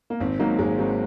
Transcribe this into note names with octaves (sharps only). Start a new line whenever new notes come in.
A#3
G#1 C4
G#2 F#3 A#3 C4 D#4
G#1 G#3
G#2 F#3 C4 D#4